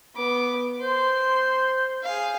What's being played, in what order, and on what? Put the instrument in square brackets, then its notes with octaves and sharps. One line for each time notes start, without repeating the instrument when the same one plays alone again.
[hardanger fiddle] B3 D6
[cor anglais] C5 [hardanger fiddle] C6
[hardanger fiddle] G#4 F5